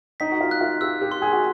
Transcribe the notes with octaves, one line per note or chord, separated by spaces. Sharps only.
D#4 B6
F#4
F4
F#6
F4
G4 E6
G4
C6
G#4
F#4